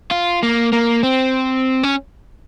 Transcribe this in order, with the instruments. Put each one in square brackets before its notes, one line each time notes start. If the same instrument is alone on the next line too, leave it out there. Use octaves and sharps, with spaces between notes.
[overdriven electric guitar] F4
A#3
A#3
C4
C#4